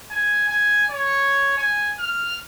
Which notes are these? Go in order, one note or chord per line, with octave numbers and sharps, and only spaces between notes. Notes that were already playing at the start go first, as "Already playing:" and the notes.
G#5
G#5
C#5
G#5
F6